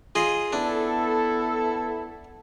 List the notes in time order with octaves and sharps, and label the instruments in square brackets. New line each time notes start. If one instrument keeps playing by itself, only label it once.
[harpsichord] F4 G#4 D#5
[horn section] B3 E4 A4 [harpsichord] D4